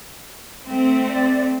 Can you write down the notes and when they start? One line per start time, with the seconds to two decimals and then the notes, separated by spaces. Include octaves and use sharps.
0.64 A3 C4
1.09 D5